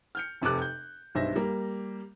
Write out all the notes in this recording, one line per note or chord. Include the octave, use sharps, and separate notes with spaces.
F6 G6 C#7
F1 C3 A4 D6 F#6
G6
B1 G2 C5 E5 A#6
G3 A#3